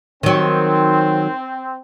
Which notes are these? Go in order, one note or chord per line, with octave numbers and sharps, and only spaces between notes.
D#3 F#3 C4